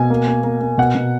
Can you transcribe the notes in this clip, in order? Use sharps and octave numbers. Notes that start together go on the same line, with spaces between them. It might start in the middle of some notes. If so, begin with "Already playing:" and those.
Already playing: B2 G#5
A#3
A#3
A#3
A#3
B2 F#5
B2